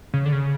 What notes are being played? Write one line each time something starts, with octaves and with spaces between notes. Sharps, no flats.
C#3
D3
C#3